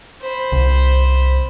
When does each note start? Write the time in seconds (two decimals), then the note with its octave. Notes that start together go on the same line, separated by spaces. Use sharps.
0.21 C5 B5
0.52 C2